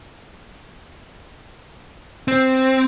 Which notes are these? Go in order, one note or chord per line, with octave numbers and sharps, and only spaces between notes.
C4